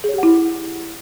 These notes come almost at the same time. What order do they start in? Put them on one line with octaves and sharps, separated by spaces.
G#4 C#5 G4 F#5 E4